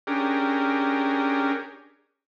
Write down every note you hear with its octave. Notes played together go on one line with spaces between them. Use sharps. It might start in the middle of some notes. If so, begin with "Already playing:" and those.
C#4 D4 G4 G#4 A#4